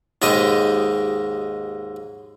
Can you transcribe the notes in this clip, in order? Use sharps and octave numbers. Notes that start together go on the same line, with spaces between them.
D#2 G#2 G4 D#5 G5